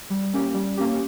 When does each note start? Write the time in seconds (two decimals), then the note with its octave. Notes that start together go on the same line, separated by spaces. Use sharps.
0.10 G3
0.33 A#3 C#4 G4
0.54 G3
0.77 A#3 C#4 G4